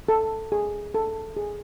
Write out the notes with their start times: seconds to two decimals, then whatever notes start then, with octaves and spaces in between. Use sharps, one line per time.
0.09 A4
0.52 G#4
0.94 A4
1.37 G#4